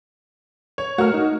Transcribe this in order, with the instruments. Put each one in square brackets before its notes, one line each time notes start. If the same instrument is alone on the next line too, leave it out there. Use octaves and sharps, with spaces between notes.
[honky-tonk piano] C#5
[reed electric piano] A3 A#4 [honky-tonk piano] F#4 F6
[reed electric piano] D#4